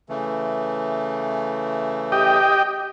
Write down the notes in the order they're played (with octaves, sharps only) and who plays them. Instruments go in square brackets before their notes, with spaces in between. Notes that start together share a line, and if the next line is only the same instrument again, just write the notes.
[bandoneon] C#3 E3 A3
[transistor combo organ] G4 D#5 G5